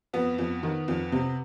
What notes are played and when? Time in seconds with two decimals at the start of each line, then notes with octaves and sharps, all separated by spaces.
0.13 F2 B3
0.38 F2
0.63 D#3
0.88 F2
1.12 C3